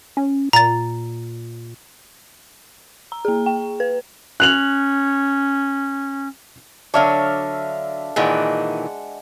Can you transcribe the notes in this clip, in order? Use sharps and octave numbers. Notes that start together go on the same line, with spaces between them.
C#4
A#2 A#5 A6
A#5
A#3 G#4
G5
B4
C#4 F#6 F7 F#7
D3 F#3 D4 C#5 E5 F5
A#2 D#3 E3 G#3 F#5